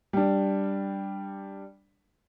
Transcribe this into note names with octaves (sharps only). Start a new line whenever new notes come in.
G3 D4